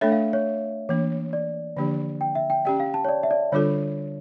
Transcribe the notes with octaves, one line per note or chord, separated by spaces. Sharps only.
A3 D4 A4 C#5 E5
F5
C#5
E3 A#3 D4
D5
D3 F3 A#3 D4 G4
G5
E5
G5
C#4 G4 D5 G5
F5
A5
C#5
D5
E5
D5
D3 G3 D4 F4 A4 C#5